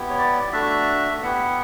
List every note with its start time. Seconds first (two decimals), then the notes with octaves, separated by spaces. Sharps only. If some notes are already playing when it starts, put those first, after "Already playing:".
Already playing: B3 E4 G4
0.10 C#5
0.18 D5
0.52 A3 D4 F#4 E5
1.22 B3 E4 G4 F#5